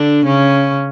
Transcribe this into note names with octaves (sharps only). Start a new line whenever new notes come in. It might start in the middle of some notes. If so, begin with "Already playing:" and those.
Already playing: D3 D4
C#3 C#4